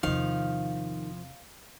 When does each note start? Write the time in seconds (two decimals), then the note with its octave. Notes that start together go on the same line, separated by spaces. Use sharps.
0.03 E2 C3 D#3 F3 F5